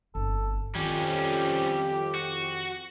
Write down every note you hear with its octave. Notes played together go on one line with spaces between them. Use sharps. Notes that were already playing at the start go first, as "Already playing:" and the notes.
G1 C4 A4
F2 D#3 G3 C#4 G4
F#4